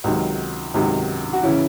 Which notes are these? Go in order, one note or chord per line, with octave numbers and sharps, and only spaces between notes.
C#2 C3 D#3 F#3
C#2 C3 D#3 F#3
F#4
C#3 E3 C#4 E4